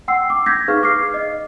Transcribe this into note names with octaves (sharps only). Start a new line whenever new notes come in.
F#5 G5 C6 E6 C7
D6
G6 G#6 A#6 B6
D#4 G#4 B4 F5 C#6 F6
D6 F6 C7
D#5